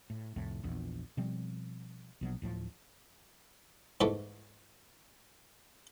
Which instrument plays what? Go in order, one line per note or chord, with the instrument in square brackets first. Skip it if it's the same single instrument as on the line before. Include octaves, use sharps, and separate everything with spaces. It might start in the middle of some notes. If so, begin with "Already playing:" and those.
[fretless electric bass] A2
C2 F2 A2
A#1 E2
B2 F3 G3 C4
A#1 B2 F#3
D1 A2 F3
[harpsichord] G#2 E3 A3